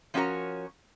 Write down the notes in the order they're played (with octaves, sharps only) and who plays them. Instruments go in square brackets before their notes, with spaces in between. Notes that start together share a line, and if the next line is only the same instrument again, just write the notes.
[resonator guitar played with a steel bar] F3 C#4 D4 F#4 A#4 C#5